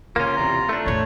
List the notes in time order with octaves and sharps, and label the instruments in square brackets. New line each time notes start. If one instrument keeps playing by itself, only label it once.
[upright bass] C#3 [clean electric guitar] A#3 C#4 [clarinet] F4
[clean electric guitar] E2 C3 [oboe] A#5
[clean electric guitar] A3 D4
[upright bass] E2 A2 [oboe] C#5